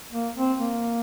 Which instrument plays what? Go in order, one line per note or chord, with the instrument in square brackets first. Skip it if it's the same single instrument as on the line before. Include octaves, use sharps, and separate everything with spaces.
[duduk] A#3
C4
A#3